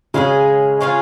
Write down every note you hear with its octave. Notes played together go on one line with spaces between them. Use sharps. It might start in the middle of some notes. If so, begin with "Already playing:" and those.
C#3 G#3 C#4 F4 G#4
G#3 C#4 F4 G#4